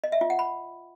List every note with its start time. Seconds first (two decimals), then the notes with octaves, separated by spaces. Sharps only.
0.04 D#5
0.12 E5
0.21 F4
0.30 F#5
0.39 B5